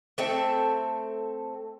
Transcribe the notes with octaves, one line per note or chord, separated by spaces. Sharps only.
A3 C4 A4 E5